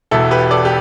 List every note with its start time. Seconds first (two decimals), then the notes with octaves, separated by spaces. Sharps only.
0.11 E1 E2 B2 E4 A4
0.31 G4 B4
0.51 A4 D5
0.65 G4